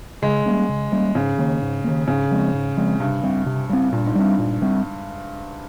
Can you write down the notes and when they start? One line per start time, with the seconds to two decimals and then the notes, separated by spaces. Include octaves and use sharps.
0.22 C#3 G#3
0.46 G3 A#3 C#4
0.69 C#3
0.92 G3 A#3 C#4
1.15 G#2 C#3
1.38 D#3 A#3
1.61 G#2
1.84 D#3 A#3
2.08 G#2 C#3
2.31 F3 G#3 C4
2.54 G#2
2.77 F3 G#3 C4
3.00 G2 C3
3.23 G3 C4
3.46 C3
3.69 G3 C4
3.92 G2 A#2
4.06 G#2
4.15 G2 G3 C4
4.38 A#2
4.62 G3 C4